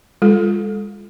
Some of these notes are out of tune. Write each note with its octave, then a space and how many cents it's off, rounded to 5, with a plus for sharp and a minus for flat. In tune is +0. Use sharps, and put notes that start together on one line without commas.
G#3 -35 F4 +0 A4 -10